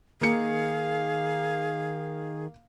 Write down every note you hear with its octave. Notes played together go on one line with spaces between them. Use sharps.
D#3 A#3 G#4 F5 C#7